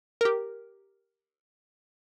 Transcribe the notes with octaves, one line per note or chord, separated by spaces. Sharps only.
G4 A#4